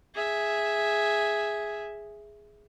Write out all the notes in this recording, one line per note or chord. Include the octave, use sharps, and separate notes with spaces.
G#4 E5